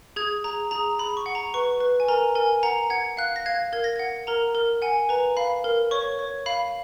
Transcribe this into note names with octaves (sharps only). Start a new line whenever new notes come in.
G#4 G#6
G#4 A#5
G#4 A#5
G#4 B5
C#6
F#5
A#5
B4 C#6
B4
G#5
A#4 A#5
A#4 G#5
F#5 A#5
F#5 G#6
F5 F#6
A#6
F5 G#6
A#4 G#6
A#6
F#5 G#6
A#4 A#5
A#4
F#5 G#5
B4 A#5
F5 B5
A#4
C#5 C#6
C#5
F5 B5